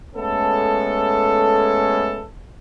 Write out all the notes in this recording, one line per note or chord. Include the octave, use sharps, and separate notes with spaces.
G#3 A3 B3 C#4 A4